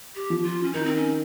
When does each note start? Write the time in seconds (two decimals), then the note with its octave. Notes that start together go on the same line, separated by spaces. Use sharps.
0.15 G4
0.30 F3
0.44 F4
0.63 C#4
0.73 D#3 D#4
0.85 C4
0.96 C#4